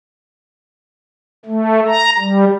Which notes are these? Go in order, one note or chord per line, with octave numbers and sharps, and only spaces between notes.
A3
A#5
G3